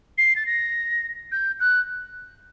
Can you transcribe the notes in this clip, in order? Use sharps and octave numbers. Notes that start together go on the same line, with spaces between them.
C7
A6
A#6
G6
F#6